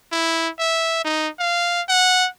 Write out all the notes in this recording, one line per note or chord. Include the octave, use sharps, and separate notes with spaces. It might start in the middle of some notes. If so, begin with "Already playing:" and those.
E4
E5
D#4
F5
F#5